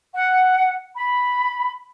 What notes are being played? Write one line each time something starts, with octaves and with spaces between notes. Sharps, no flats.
F#5
B5